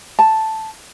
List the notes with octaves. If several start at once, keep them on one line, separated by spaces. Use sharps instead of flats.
A5